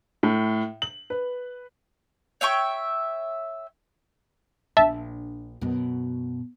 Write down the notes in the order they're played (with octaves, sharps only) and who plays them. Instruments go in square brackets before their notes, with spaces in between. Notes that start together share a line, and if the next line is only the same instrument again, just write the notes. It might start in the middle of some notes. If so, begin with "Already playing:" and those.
[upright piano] A2
F#7
B4
[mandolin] C#5 E5 G5 C#6
[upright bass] A#1 D4 [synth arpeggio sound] E5 A5
[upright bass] F#2 B2